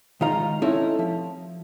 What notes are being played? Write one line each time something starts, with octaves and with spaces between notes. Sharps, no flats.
D#3 G#3 D#4 F4 F5 A#5
A3 C4 C#4 D#4 E4 A4
F3